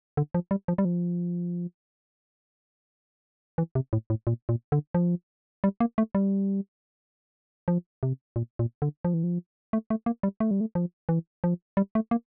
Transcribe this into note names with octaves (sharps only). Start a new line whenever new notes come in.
D3
F3
G3
F3
G3
F3
E3
C3
A2
A2
A#2
A#2
D3
F3
G3
A#3
A3
G3
F3
C3
A#2
A#2
D3
F3
E3
F3
A3
A3
A#3
G3
A3
G3
A3
F3
E3
F3
G3
A3
A#3